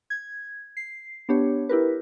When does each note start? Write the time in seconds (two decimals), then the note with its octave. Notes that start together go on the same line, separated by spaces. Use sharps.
0.10 G#6
0.77 C7
1.29 B3 D4 G4 C#5
1.69 E4 G4 A#4 B4